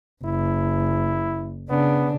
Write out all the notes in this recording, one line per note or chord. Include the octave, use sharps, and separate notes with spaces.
F#1 E4
C#3 B3 D4